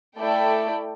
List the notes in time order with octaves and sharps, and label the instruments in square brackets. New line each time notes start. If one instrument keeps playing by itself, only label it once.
[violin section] A3 E4 A4 D5 G5